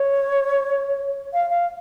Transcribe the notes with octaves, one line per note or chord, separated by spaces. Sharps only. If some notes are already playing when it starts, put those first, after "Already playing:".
Already playing: C#5
F5
F5